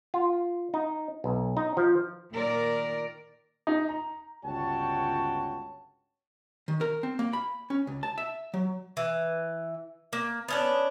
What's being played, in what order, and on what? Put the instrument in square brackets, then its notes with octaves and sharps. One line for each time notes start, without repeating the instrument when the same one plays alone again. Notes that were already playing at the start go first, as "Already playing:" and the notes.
[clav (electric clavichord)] F4
D#4
B1
D#4
F3
[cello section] A#2 D#3 A#4 D5
[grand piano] D#4
A#5
[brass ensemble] G1 C#2 F#4 C#5 G5 A5
[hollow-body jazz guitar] D#3
A#4
C4
A#3
B5
C#4
C#2
A5
E5
F#3
[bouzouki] E3
A#3
B3 C#4 D4